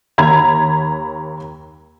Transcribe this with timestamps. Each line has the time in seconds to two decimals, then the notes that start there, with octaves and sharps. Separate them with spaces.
0.18 D#2 A#5 B5 G#6